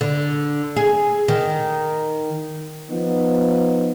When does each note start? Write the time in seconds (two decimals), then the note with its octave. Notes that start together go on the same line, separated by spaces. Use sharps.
0.01 D3
0.77 G#4
1.28 D#3
2.90 F3 B3 D#4